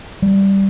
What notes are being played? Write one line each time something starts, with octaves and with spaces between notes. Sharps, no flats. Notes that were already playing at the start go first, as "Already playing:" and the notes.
G3